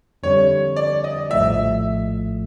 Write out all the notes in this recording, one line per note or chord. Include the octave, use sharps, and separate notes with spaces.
F2 D3 G3 C#5
D5
D#5
A#1 A2 F3 A3 E5